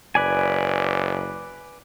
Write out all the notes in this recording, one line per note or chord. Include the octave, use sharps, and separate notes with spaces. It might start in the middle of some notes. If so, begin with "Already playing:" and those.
F#1 B4 D5 G#5